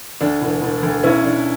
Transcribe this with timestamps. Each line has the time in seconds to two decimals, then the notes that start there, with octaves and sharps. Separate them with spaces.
0.21 D2 D4
0.42 E1
0.62 E1
0.83 D2
1.03 B1 C#4 E4
1.24 B1 D4